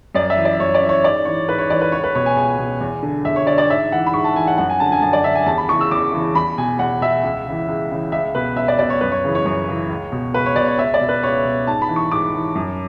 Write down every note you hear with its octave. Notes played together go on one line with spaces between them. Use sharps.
F#2 D5
E5
E3
D5
F#2 C#5
D5
E3
C#5
G#2 D5
E3 C#5
G#2 B4
C#5
E3 D5
B4
C#2 C#5
B4
B2 C#5
G#5
C#2 G#5
B2
E2
D3
E2 E5
C#5
D3 D5
D5
G#2 E5
E3 F#5
B5
G#2 C#6
A5
E3 G#5
F#5
F#2 F#5
G#5
D3 A5
G#5
F#2 A5
D5
D3 E5
G#5
E2 A5
B5
E3 C#6
C#3
E6
E2 D6
C#3 E3
E2 B5
B2 G#5
E2 F#5
B2 E5
C#2
C#3 E3
C#2
C#3 E3
C#2 E5
B2 B4
C#2 E5
D5
B2 D5
C#5
F#2 B4
C#5
C#3 E3
C#5
F#2 C#5
C#3 E3
C#2
B2
C#2 B4
C#5
B2 D5
C#5
C#2 E5
D5
B2
B4
C#2 C#5
B2
G#2 A5
B5
E3
C#6
G#2 D6
E3
F#2